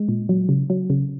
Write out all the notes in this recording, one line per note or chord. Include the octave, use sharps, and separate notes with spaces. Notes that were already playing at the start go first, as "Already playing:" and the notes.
Already playing: G#3
A#2
F#3
C#3
F#3
C#3